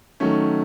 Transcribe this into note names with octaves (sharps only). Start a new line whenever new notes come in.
D#3 F#3 A3 C#4